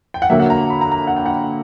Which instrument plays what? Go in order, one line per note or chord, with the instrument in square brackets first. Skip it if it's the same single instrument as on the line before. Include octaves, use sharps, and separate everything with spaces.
[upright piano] G5
F#5
D3 F#3 A#3 E5
F#5
A#5
B5
A#5
A#5
F#5
G5
F#5